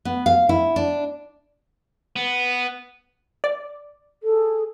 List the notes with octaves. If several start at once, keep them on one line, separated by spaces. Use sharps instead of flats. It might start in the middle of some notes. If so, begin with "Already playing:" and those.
B3
F5
E4
D4
B3
D5
G#4 A4